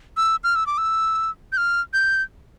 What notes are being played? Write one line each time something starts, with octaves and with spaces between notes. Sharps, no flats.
E6
F6
E6
D6
E6
G6
F6
G6